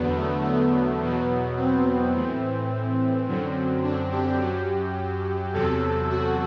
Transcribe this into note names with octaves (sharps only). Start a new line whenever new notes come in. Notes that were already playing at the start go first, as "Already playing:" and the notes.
Already playing: E2 D3 F#3 B3
A3
B3
E2 B2 F#3
C4
A2 E3
F#2 D3 F#3
D4
G4
F#2 F#3
E2 C3 F#3 A4
F#4